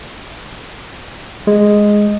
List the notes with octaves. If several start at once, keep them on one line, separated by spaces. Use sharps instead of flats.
G#3